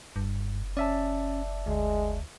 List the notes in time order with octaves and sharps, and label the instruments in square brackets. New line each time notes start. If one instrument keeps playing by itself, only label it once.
[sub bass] F#1 [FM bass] G2
[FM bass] C#4 [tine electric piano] D5 E5 A5
[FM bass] D2 [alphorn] G#3